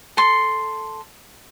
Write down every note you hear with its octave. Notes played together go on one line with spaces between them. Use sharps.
A4 C6